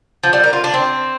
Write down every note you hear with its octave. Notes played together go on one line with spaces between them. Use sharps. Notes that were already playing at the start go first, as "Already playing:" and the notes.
F3
G3
A#4
F4
D4
C4